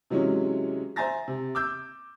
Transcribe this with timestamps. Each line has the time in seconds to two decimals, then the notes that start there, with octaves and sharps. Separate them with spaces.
0.10 C3 E3 F#3 G#3 C#4
0.96 C5 E5 G#5 A#5 A6 A#6
1.28 C3
1.55 D6 E6 G6